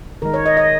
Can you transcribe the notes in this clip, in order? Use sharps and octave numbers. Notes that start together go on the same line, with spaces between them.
D#3 G#3 A#4
C#5
D#5
D#5